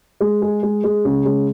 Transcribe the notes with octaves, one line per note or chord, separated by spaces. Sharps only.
G#3
G#4
G#3
G#3
C#3
G#3